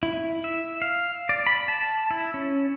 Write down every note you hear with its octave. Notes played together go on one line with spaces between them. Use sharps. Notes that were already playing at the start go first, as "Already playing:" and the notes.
E4
E5
F5
D5
B5
A5
E4
C#4